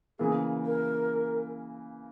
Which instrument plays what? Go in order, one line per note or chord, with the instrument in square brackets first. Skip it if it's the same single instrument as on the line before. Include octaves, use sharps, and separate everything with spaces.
[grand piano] C#3 E3 A#3 [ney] G#4
[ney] A#4